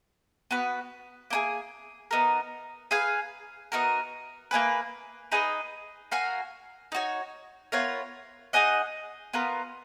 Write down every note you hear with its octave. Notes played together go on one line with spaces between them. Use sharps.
B3 F#4 B4
A#3 D#4 G#4
B3 D#4 A#4
G#4 B4 F5 G#5
B3 D#4 F#4 A#4
A#3 C#4 G#4 B4
D#4 G#4 B4 D#5
F#4 A#4 F5 G#5
D#4 F#4 C#5
B3 F4 A#4 C#5
D#4 G#4 D#5 F#5
B3 F4 A#4